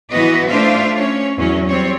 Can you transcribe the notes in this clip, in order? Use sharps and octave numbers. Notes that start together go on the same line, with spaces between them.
E3 B3 F#4 B4 D#5
A3 D4 F4 C5 E5 F5
C#4 C#5
E2 F#3 C#4
G3 C4 C#5